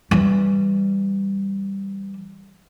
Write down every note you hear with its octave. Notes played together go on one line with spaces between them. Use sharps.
E3 G3